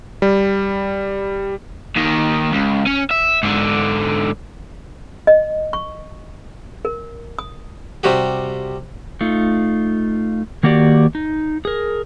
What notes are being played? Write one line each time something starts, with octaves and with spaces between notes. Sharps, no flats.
G3
D#2 D#3
C#2
C#4
E5
G#2 D3
D#5
C#6
A#4
D#6
C3 G3 F#4 G4
A3 D#4 F4
D#3 A#3 F#4 G4 D5
D#4
G#4 A#4